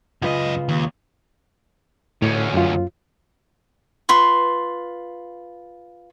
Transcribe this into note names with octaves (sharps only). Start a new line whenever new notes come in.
C#2 F#2 F4 B4 D#5
D#2
D2 A2 C#4
F#2 F4
F4 B4 C6 C#6